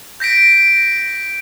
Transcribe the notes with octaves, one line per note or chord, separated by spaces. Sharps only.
G6 A#6 B6 D7